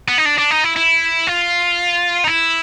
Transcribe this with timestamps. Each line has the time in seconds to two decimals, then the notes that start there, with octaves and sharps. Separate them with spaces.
0.08 B3
0.18 D#4
0.26 D4
0.38 D4
0.51 D#4
0.64 E4
0.76 E4
1.27 F4
2.24 D#4
2.27 E4